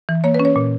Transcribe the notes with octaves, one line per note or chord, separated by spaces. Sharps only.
E3
A#3 C#5
B4
C#4
C#5
A#2